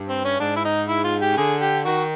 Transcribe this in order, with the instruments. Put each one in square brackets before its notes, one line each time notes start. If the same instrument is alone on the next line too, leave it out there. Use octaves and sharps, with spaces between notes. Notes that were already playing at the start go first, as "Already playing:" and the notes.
Already playing: [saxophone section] G2
[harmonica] C4
C#4
[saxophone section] G#2 [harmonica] D4
[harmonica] E4
D#4
E4
F4
G4
[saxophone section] C#3
[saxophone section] D3 [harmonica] G#4
[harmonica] G4
[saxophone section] D#3 [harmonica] F#4